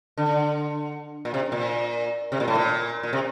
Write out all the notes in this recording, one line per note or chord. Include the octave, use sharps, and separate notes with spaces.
D3
A#2
C3
A#2
C3
A#2
A2
A#2
A#2
C3